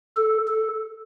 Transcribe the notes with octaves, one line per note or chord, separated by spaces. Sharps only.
A4
A4